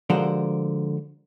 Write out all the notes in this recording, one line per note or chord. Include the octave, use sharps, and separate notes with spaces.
D3 F3 G#3 F#4 A#4 C5